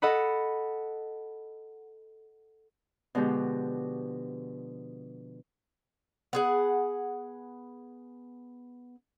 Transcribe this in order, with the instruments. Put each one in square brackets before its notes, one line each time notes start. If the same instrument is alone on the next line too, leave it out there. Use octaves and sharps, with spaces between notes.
[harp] A4 D#5 F#5 B5
B2 D3 F3 G#3 D4 G4
[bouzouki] B3 G#4 F#5